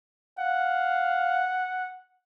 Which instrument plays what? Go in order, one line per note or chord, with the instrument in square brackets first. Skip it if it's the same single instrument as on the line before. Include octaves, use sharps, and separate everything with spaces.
[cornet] F5 [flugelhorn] F#5